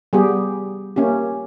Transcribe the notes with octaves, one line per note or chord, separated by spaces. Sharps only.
G3 B3 G4 G#4
A#3 C#4 G4